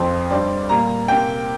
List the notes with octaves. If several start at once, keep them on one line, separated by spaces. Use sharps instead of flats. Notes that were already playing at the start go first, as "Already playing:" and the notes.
Already playing: F2 F3 C4
G2 G3 C4 D5
A#2 G3 A#3 A#5
C3 A#3 G5